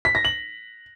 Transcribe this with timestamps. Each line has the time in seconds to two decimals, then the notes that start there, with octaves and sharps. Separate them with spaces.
0.05 B6
0.15 A#6
0.25 F#7